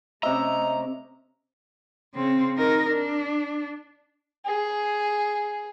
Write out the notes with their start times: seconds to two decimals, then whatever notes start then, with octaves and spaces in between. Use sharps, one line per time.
0.23 C3 A3 C#4 D#5 E5 A#5
2.15 C#3 C4
2.57 D#4 A#4
2.90 D4
4.46 G#4